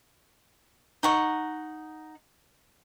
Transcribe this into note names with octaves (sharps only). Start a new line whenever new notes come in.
D#4 F#5 C#6